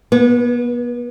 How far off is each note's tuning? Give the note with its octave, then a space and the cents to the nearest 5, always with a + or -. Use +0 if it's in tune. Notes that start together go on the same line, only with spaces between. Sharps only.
B3 -35 B4 +0